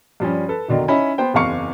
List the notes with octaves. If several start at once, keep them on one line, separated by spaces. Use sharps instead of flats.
G2 F3 G3 C#4
A4 B4
F1 B2 D3 D#3
C#4 D#4 E4 C#5 B5
B3 C5 G5
F#1 E2 C4 F5 C#6 C#7